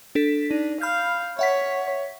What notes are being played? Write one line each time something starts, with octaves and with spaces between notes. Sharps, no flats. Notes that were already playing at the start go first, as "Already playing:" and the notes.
D4 A4 B6
D4 D#4
F5 B5 F6 G6
C#5 E5 F#5 B6